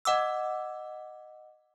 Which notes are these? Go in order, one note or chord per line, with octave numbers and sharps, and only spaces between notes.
D#5 F#5 D6 E6